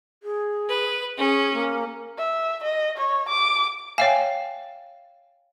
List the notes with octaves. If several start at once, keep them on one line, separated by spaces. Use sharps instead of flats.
G#4
B4
C#4 G#4
A#3
E5
D#5
C#5
D6
C#5 E5 F5 G5 G#5